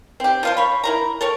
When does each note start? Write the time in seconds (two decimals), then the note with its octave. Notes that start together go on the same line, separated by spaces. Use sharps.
0.20 C4 G4
0.43 F3 F4 C5
0.57 C#5 B5
0.84 E4 A#4 A#5
1.21 A4 A#4 C#5